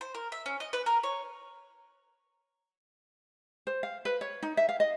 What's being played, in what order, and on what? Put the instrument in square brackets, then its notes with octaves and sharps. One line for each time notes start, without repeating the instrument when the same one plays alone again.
[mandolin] C5
A#4
E5
C#4
D#5
B4
A#4
C#5
[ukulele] C5
F5
B4
C#5
D#4
E5
F5
D#5